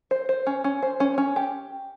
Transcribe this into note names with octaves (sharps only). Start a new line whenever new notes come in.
C5
C5
C#4
C#4
C5
C#4
C#4
G4